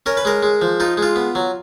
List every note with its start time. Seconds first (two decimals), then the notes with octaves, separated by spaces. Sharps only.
0.06 C#4 A#4
0.17 B4
0.25 G#3 A#4
0.43 G#3
0.62 F3
0.80 D#4 F4
0.97 G#3
1.03 F4
1.16 B3
1.35 F#3